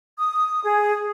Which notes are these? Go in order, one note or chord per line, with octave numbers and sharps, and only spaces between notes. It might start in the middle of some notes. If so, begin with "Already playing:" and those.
D#6
G#4